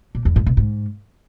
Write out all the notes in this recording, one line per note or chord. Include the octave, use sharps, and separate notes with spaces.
A#2
E2
A2
B2
G#2